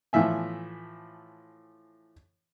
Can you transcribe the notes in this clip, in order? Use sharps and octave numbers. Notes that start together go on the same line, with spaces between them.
A2 E3 F3 E5 G#5